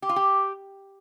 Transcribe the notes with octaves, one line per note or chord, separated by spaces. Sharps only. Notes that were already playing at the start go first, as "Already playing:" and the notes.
G4
F4
G4